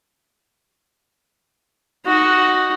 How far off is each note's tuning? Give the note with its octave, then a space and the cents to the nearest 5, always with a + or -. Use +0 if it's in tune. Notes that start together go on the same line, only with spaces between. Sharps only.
D#4 +0 F#4 +0